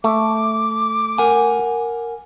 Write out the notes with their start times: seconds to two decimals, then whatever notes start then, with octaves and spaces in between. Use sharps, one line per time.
0.04 A3 D6
1.18 A#4 F#5 G#5